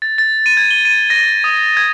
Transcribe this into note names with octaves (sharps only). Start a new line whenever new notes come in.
A6
A6
D#7
G#6
G7
D#7
A#6
D#6
G#6